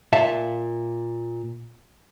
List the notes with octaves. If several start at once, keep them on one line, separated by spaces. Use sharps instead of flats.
A#2 E5 F5 A5